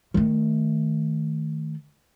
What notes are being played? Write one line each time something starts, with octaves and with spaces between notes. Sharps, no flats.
D#3 A3